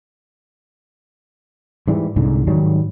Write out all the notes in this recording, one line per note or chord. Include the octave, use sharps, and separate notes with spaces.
G#2 E3 G3
C2 G#2 D3
G#2 D#3 F#3 G3